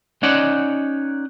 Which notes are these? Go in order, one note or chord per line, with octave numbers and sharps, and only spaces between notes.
C#4 D#4 C#5 D5 F#5